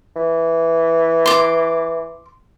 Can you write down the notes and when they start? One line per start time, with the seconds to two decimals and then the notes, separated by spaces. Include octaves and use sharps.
0.16 E3
1.26 C6 D6